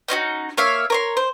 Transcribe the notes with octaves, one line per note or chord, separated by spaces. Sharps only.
C#4 D#4 F4 F#4
A#3 C#5 E5 F5
A#4 C#5 C6
C5